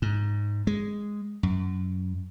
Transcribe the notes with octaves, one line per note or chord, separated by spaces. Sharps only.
G#2
G#3
F#2